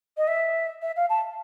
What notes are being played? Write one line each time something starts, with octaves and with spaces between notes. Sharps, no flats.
D#5
E5
E5
F5
A5